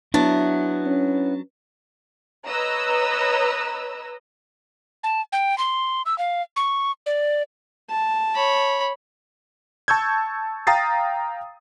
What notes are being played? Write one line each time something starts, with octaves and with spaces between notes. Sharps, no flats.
F#3 B3 D4 E4 A5
C#4
B4 C#5 D#5 A#5 E6
A5
G5
C6
E6
F5
C#6
D5
A5
C#5 B5
A5 C#6 E6 G6 G#6
F5 G5 A#5 D#6 A6 C7